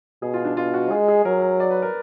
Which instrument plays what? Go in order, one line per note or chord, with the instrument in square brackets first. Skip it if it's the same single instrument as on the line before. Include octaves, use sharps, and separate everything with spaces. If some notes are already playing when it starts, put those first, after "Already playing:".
[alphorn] B2 [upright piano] G#4
[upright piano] F4
D4
[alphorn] B2 [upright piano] F4
[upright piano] F#4
[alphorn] G#3 [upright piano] G#4
[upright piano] G#4
[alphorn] F#3 [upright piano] A#4
[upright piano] A#4
D5
B4
A#4